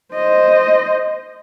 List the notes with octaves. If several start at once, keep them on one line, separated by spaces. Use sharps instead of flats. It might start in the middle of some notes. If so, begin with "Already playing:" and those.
C5 D#5